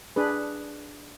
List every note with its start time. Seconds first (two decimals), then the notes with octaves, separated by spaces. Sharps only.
0.16 D4 G#4 B4